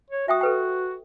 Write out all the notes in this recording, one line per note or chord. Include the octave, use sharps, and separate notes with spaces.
C#5
F#4 E5 G5 D#6
A4 B4 G5